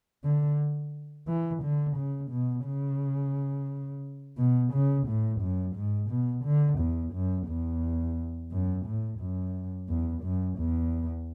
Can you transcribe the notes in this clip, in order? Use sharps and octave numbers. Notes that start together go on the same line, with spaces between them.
D3
E3
D3
C#3
B2
C#3
B2
C#3
A2
F#2
G#2
B2
D3
E2
F#2
E2
F#2
A2
F#2
E2
F#2
E2